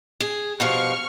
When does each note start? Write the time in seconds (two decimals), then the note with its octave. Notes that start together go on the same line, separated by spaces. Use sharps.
0.20 G#4
0.60 G2 B2 F3 C#6 F6